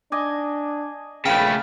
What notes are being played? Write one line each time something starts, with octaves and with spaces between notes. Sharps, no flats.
D4 D#5 G#5 D6
A#1 C#3 A3 F5 G5 B5